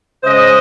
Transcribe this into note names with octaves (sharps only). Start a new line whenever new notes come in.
C#3 G#3 C5 D#5